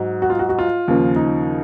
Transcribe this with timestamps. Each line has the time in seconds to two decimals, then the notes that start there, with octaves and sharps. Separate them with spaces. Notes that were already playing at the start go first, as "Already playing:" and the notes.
Already playing: G#2 F#3
0.22 F#4
0.30 F4
0.39 F#4
0.49 F#4
0.59 F4
0.88 D#2 C#3 F3
1.16 D#4